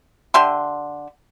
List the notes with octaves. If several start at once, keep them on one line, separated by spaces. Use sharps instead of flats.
D3 G4 E5 C6